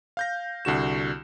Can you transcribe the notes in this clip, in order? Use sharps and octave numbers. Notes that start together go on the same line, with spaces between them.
F5 G6 A#6
C2 D3 F#4 E7